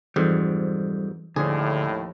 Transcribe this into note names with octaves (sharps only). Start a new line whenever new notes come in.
F2 G#2 E3 G3
D#2 A2 D3 F3 G#4